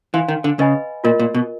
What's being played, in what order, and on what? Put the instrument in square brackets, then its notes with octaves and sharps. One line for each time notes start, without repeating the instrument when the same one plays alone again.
[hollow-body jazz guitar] E3 [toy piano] C5 F5 G#5 C6
[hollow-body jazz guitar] D#3
D3
[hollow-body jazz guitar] C#3 [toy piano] B4 D#5 G#5 B5
[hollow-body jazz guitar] A#2 [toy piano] F4 A#4 D#5
[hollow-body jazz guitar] A#2
B2